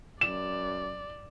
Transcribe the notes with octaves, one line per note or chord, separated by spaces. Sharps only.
F#2 D5 E7